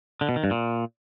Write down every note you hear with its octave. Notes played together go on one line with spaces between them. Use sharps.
D3
B2
D#3
G2
A#2